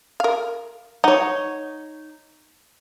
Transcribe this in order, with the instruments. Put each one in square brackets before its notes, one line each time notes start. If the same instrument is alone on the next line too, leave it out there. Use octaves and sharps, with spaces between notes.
[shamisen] A#4 F5
[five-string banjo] D#4 C#5 [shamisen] F#5